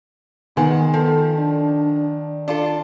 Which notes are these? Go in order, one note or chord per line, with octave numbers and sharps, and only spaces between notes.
D#3 G#3 B3 F#5
F3 A4
D4
D4 F4 A4